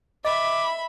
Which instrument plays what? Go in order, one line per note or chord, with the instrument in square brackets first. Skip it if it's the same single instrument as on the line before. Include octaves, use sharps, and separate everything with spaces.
[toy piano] D#5 [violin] E5 B5 [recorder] D6